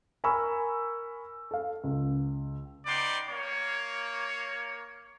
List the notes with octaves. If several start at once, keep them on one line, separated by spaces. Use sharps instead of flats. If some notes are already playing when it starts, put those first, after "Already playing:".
A#4 G#5 B5 C#6 E6
A4 F5
C#2
B3 D#4 D5 G5 C6
A#3 C#5